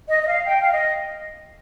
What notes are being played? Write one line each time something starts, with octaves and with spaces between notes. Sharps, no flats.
D#5
D#5
F5
G5
F5
D#5